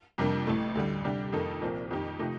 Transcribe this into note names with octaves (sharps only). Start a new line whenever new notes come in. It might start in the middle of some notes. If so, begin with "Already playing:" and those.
F2 C3 G3 A#3 D4
A1 A2 A3
D2 D3 G3
C3 G3 D4 G4
F2 D#3 A#3 D#4 A4
C2 A#2 F3 C4
F2 D#3 A#3 D#4 G4
C3 F3 A3 D#4